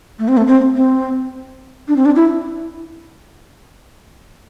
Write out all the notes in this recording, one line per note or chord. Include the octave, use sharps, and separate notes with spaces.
A3
C4
A3
C4
C4
D4
C4
D4
E4